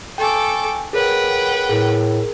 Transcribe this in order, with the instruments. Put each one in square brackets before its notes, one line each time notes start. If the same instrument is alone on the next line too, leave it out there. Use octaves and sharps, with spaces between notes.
[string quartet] A4 C#6 D6 [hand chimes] G5 G#5
[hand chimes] G#4 A#4 C#5 [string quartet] B4 F#5 G5
[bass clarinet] A2 [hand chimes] G#4 A#4